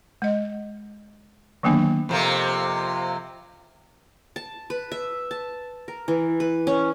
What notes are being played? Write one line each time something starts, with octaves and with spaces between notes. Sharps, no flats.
G#3 D#5
D3 D#3 F#3 A#3 B3 D4
F2 C3 A#3
A5
B4
E5
A5
A#4
E3
B4
C#4